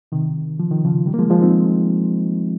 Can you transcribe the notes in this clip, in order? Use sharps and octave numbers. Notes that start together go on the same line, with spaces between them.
C3 D#3
F3
D#3
C#3 F3
D#3 G3
A#3
F3 G#3
F3 G#3
C4 D#4